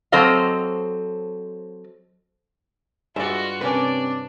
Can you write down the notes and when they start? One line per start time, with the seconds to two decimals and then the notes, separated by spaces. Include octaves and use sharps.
0.12 F#3 C4 A4 C5 D#5 F5
3.16 G2 G#3 F4 F#4 D5 E5
3.61 C3 G3 A#3 C#4 D4 B4 D5